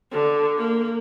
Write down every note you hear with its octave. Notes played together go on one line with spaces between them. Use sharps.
D3
A#3